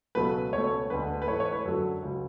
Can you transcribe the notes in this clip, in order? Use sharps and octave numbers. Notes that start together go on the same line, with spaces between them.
C#2 B2 F#3 A3 B4
C#2 B2 A3 C#5
D2 D3 G#3 B4
B4
G#2 E3 A3 C#5
C#5
B4
F#2 D3 F#3 A4
C#2 C#3 F#3